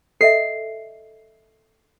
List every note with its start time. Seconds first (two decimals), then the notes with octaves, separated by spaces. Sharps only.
0.21 A4 D#5 E5 C7